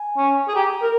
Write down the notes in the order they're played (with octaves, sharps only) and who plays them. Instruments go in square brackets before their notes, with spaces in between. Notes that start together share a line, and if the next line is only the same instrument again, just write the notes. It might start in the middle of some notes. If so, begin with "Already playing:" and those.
Already playing: [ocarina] G#5
[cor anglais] C#4
G#4
[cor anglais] G4 [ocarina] A#5
[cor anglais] A#4